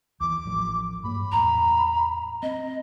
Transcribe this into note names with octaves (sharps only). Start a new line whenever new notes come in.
D#2 E3 D6
A1 F3
G2 A#3 B5
E2 A2 A#5
C4 D#5